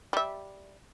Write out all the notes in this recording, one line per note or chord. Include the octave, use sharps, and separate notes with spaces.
G3 E5